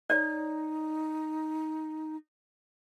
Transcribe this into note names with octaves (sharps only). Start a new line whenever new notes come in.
D#4 C#5 D5